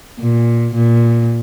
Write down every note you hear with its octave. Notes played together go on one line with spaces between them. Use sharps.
A#2
A#2